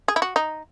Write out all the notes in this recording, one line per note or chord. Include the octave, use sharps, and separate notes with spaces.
G#4
E4
F#4
D#4